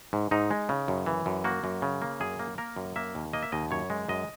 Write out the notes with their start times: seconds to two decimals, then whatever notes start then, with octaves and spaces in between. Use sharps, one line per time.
0.13 G#2
0.31 G#2 D#4
0.51 G#3
0.69 C#3
0.88 F#2
1.06 E3
1.26 F#2
1.44 A#3 F#4
1.64 F#2
1.82 C#3
2.02 A#3
2.20 F#2 G#4
2.39 A#3
2.58 A#3 A#4
2.76 F#2
2.96 A#3 E5
3.15 D#2
3.33 A#3 D#5
3.42 E5
3.52 D#2 D#5
3.71 F#2 C#5
3.90 G#3
4.08 F#2 D#5